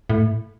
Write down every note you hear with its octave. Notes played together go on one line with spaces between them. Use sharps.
A2